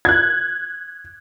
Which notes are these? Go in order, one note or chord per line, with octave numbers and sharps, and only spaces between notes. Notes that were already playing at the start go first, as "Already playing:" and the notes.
F#6 G#6